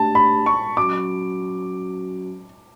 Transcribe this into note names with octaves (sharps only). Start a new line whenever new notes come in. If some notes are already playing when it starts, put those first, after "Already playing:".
Already playing: A3 D4 G4 A5
B5
C#6
F#3 C#4 F#4 D6